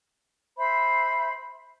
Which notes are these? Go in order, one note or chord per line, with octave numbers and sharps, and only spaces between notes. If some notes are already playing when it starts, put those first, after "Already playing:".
C5 E5 B5